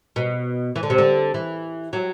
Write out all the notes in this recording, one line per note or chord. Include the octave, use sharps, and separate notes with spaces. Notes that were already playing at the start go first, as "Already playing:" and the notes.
B2
E3
D3
C3
D3
E3
F#3